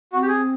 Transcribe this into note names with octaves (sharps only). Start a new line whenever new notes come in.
C4 F#4
G4
G#4